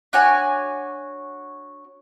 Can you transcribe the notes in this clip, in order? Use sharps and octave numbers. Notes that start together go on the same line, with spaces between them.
D4 F#4 C#5 G#5